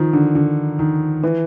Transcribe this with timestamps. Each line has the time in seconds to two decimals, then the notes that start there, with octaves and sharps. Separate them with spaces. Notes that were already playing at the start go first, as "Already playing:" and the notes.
Already playing: D#3 F3
0.13 D3
0.35 D3
0.79 D#3
1.23 E3